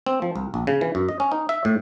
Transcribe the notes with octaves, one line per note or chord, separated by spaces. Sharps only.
C4
F3
C2
A#1
C#3
E3
F#2
D#5
C#4
D#4
E5
A2